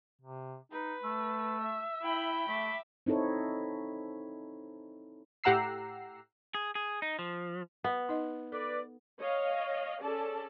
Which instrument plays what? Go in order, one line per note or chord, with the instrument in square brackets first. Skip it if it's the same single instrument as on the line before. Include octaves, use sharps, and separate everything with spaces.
[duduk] C3
[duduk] D#4 [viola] B4
[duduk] A3 [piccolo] E6
[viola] E5
[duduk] E4 [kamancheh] G5 B5
[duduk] A3 [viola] E5 D6 [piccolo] B6
[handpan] C4 D#4 E4 A4 C#5
[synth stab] A2 G4 F#5 A#5 E6 C7
[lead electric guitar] G#4
G#4
D#4
F3
[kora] B3
[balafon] D#4 D#5
[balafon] A4 [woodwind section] B4 D5
[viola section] C#5 D#5 F5
C#4 G#4 A4 D5 A5